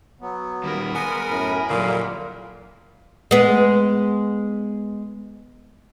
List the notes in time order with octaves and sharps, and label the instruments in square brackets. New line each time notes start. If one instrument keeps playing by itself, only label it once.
[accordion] F#3 B3
[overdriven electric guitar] D#3 G3 [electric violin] A#4 B5
[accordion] G#3 [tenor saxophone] B3 [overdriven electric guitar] G#5
[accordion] F#2 A2
[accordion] F2 G3 F5 [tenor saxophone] A#2 [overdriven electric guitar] D3 F#3
[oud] G#3 B3